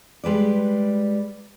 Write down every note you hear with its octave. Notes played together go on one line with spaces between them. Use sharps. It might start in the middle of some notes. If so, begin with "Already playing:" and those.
G3 G#3 B4 D5